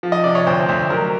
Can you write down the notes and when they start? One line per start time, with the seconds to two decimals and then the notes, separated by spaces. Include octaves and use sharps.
0.03 F3
0.12 D#5
0.24 C3 D5
0.35 C#5
0.47 D2 C5
0.68 D2 C5
0.90 F#3 A#4